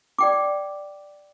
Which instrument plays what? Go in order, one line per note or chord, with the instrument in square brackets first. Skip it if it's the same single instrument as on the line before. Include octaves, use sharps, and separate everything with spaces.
[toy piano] D5 G5 D6